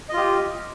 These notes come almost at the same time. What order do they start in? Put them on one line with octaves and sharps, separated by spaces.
D#5 F4 G4